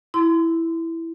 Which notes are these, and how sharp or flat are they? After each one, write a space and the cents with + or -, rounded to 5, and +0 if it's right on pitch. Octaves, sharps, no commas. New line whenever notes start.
E4 +0 C6 -25